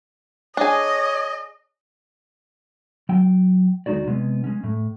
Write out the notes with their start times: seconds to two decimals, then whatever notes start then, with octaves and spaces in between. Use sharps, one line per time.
0.57 D4 G#4 C#5 D#5
3.09 F#3 G5
3.86 D2 G#3 D#4 F#4 D5
4.07 C3 G#3 B3 C#4
4.44 G#3 C#4
4.64 A2